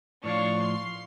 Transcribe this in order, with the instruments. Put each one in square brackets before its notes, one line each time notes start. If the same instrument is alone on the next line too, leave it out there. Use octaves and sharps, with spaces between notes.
[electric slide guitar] A2 F3 [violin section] D4 C#5 [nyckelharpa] F5 C#6
[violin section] C6 C7